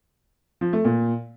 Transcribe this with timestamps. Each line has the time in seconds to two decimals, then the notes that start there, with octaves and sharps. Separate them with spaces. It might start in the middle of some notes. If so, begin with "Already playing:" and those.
0.61 F3
0.73 A3
0.85 A#2